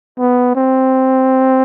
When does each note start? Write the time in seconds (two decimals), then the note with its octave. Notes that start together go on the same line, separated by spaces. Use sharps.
0.19 B3
0.56 C4